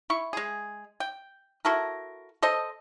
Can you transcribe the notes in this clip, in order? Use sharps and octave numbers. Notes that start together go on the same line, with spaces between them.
E4 C#6
G#3 G#4
G5
E4 F#4 A4 A#4
A4 C5 D#5